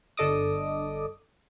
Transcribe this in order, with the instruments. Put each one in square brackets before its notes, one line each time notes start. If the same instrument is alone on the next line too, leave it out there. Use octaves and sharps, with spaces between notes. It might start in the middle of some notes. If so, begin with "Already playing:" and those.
[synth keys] G1 D4 A4 D#5 D6 D#6